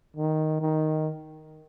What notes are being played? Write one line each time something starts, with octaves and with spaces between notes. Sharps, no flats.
D#3
D#3